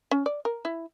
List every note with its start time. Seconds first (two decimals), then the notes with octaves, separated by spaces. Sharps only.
0.11 C#4
0.26 D5
0.45 A#4
0.65 E4